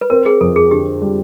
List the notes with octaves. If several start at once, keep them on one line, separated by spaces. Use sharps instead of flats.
B4
C4 A#4
G#4
F2 A4
G#4
D3 G4
G3